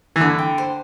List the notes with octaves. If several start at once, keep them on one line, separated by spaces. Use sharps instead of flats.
E3
D3 B5
G5
C5